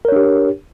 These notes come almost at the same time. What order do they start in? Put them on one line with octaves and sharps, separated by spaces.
A#4 C#5 D4 G4